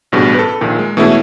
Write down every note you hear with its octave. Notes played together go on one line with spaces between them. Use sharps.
A1 G2 B2 G#4
A4 B4
A#1 A#2 D#3
G#3
B2 E3 A3 C#4 E4 G#4